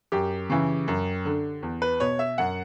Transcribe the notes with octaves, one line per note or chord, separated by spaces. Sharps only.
F#2 G4
C#3 E3
F#2
D3
E2
B4
B2 C#5
E5
F#2 F#5